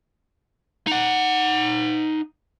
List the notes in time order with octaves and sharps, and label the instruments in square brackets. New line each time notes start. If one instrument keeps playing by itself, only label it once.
[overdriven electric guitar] D#4 F#5